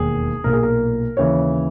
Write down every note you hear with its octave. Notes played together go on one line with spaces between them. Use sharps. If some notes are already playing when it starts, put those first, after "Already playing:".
Already playing: E1 D#2 D#3 G#4
B1 A#2 A#3 A#4
G#4
A#4
D#2 C#3 E3 C#5